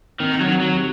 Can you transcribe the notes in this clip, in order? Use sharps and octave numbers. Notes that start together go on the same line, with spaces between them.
D#3 C4
F#3
D#3
F#3
G4